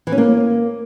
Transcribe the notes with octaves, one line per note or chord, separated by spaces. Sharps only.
E3
C#4
A#3